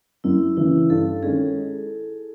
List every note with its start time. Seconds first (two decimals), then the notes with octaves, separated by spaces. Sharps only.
0.24 F#2 E4
0.57 C#3 E3 E4
0.90 G2 A4
1.23 D#3 G#3 C#4 G#4